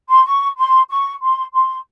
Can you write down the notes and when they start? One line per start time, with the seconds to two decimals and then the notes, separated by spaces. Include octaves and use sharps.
0.09 C6
0.25 C#6
0.57 C6
0.89 C#6
1.22 C6
1.53 C6